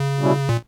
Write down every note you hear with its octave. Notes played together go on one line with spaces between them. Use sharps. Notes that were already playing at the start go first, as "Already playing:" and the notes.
Already playing: C#3
B2 G3 C#4 E4
A#2